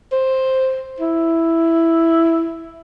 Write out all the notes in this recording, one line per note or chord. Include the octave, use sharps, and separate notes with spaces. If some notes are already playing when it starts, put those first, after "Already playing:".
C5
E4